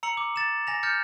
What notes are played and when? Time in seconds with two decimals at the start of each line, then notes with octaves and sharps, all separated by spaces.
0.03 A#5 E6 C#7 F#7
0.17 D6
0.36 A6 E7
0.67 G#5 A#6 F7
0.83 F6 G6 A6 C#7